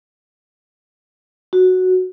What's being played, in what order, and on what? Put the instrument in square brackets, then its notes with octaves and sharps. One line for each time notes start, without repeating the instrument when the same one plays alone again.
[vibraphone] F#4